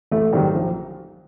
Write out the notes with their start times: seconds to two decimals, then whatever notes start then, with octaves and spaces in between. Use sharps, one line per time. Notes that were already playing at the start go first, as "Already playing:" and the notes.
0.11 A1 A3
0.33 G#2 D#3 F#3 G3
0.55 A#1